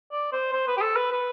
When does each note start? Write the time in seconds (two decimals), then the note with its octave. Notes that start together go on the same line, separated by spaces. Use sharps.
0.12 D5
0.32 C5
0.52 C5
0.67 B4
0.77 G4
0.81 A4
0.96 B4
1.11 B4